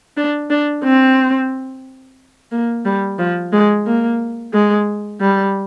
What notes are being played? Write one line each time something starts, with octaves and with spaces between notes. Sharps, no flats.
D4
D4
C4
A#3
G3
F3
G#3
A#3
G#3
G3